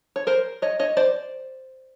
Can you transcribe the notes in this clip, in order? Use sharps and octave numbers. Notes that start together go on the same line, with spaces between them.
C#5
A#4 C5
C#5 D#5
C#5 D#5
C5 D5